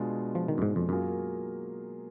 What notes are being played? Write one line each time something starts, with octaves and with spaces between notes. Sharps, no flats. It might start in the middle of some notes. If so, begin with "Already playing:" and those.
Already playing: B2 G#3 D4 F4 G#4
F3
D#3
F#2
G#2
F2
F#2 F#3 A#3 F4 G#4